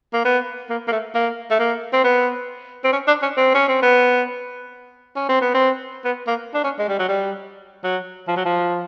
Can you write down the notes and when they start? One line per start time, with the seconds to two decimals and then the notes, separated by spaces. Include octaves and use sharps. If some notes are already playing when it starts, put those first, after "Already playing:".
0.13 A#3
0.25 B3
0.70 A#3
0.88 A#3
0.92 A3
1.15 A#3
1.51 A3
1.59 A#3
1.93 C4
2.04 B3
2.84 C4
2.93 C#4
3.07 D4
3.22 C#4
3.37 C4
3.54 C#4
3.69 C4
3.82 B3
5.16 C#4
5.29 C4
5.41 B3
5.54 C4
6.05 B3
6.27 A#3
6.54 D4
6.64 C#4
6.79 G#3
6.88 G3
6.99 F#3
7.08 G3
7.84 F#3
8.28 F3
8.37 F#3
8.45 F3